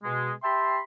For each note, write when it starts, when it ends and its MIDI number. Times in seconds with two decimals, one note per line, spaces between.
0.03 0.31 47
0.03 0.31 56
0.43 0.79 67
0.43 0.79 76
0.43 0.79 79
0.43 0.79 81
0.43 0.79 83
0.43 0.79 84